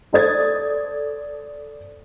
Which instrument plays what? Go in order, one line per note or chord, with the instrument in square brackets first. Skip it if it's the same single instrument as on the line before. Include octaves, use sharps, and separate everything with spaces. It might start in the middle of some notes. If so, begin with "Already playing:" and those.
[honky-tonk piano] A4 C5 D5 D#6 G#6 A6